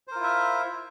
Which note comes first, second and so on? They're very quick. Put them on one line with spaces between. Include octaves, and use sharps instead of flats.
C5 A#4 F4 E4 E5